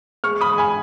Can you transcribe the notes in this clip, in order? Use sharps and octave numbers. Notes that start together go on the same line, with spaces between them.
G#3 C#6 F6
B5 D#6
G#3
G#5 B5